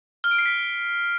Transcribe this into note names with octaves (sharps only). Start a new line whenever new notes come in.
F6
D7
C7
B6